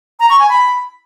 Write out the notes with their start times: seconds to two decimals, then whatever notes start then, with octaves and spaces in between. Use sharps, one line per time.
0.20 A#5
0.30 C#6
0.40 G#5
0.49 B5